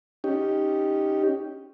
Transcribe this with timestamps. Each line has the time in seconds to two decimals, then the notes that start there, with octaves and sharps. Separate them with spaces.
0.24 C#4 D#4 G4